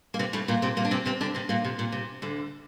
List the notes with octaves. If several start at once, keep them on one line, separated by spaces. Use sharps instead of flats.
A#3
C3 C4
A2 A3
A#2 A#3
C3 C4
A#2 A#3
D4
C3 C4
C3 C4
D3 D4
C3 C4
A#2 A#3
C3
A#2
C3
D2 D3